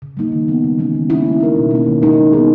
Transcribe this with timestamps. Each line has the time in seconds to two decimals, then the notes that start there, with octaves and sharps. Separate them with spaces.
0.02 C#3
0.17 G3 A#3 D#4
0.32 D#3
0.48 G3 B3
0.64 C#3
0.78 E3 G#3 C#4
0.95 D#3
1.10 G3 A#3 C#4 E4
1.25 G#3
1.40 D#4 A#4
1.56 B2
1.71 A#3 C#4
1.86 D#3
2.02 G#3 D#4 A#4
2.17 G3
2.33 B3 D#4 G#4